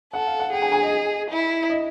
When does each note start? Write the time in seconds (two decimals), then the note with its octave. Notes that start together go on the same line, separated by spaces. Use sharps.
0.13 A4 F#5
0.27 F5
0.40 F#5
0.52 G#4 G5
0.62 G#5
0.72 G#5
0.83 D#5
1.31 E4
1.70 D#5